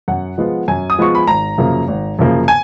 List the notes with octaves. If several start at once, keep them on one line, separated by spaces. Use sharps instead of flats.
F#2 F#5
F3 G#3 B3 F4
F#2 G#5
D#6
F3 G#3 B3 F4 C#6
B5
G#1 A#5
F#2 C#3 F3 A#3
G#1
F#2 C#3 F3 A#3
G#5